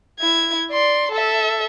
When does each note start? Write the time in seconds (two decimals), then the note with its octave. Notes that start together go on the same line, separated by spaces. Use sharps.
0.19 E4 G#6
0.71 D5 C6
1.11 A4 E5